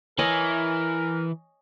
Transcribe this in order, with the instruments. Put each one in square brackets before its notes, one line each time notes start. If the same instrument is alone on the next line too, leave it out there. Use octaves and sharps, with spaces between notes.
[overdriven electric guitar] E3 [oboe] A#4 [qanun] C#5 D#5 G#5